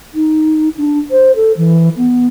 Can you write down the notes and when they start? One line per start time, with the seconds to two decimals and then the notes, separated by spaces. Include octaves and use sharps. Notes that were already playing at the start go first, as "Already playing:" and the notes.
0.15 D#4
0.77 D4
1.11 C5
1.36 A4
1.57 E3
1.97 B3